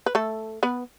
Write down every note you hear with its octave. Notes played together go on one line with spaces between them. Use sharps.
B4
A3 A4
B3 B4